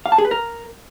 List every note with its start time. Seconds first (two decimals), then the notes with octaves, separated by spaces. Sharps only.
0.06 F5
0.12 A5
0.18 G#4
0.25 B4
0.31 A#4